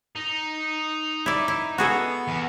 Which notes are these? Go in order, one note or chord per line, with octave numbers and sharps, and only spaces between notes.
D#4
E4 D5
E4
B3 F#4 G#4 A4
E2